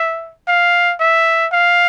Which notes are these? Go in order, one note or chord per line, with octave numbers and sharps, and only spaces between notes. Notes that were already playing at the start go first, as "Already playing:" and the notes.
Already playing: E5
F5
E5
F5